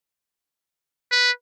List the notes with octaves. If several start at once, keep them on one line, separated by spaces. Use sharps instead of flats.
B4